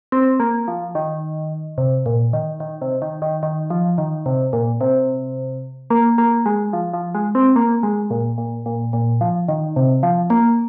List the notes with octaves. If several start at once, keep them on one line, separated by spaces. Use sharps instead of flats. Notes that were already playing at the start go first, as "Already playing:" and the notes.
C4
A#3
F3
D#3
C3
A#2
D#3
D#3
C3
D#3
D#3
D#3
F3
D#3
C3
A#2
C3
A#3
A#3
G#3
F3
F3
G#3
C4
A#3
G#3
A#2
A#2
A#2
A#2
F3
D#3
C3
F3
A#3